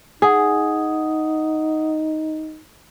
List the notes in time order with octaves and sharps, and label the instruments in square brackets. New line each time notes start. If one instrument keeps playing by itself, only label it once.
[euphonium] D#4 [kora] G#4 [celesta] F#5 D#6